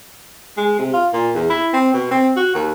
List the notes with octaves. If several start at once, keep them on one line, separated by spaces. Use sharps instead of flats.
G#3
C3
F4
A#2
E2
E4
C4
B2
C4
F#4
D#2